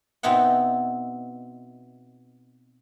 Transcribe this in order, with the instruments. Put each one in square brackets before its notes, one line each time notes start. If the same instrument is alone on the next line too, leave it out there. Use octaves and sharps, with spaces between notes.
[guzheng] B2 B3 C4 D#4 E4 F#5